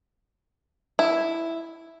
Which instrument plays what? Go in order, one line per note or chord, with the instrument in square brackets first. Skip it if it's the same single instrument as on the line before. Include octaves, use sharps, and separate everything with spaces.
[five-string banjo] E4